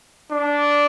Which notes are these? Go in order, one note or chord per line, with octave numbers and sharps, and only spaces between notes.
D4